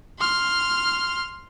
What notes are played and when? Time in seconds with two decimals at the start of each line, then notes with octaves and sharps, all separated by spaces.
0.19 C6 F6